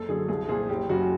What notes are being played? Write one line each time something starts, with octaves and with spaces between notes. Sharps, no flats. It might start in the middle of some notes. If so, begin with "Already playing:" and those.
Already playing: F#1 A4
F#2 D3 F#3 G#4
C2 G#4
A#2 F3 G#4
F#1 G4
F#2 C#3 F#4